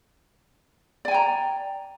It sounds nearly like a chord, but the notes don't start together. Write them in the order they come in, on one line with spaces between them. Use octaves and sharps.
D5 G#5 G5 A#5